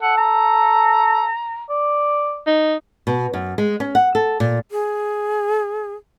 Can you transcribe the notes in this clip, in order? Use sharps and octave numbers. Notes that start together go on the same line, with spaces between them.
A4 F#5
A#5
D5
D#4
B2
F#2
G#3
C#4
F#5
A4
A#2
G#4